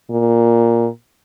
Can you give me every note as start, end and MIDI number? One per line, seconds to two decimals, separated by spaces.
0.10 0.88 46